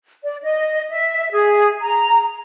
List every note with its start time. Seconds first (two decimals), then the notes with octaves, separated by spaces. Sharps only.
0.24 D5
0.43 D#5
0.90 E5
1.32 G#4
1.81 A#5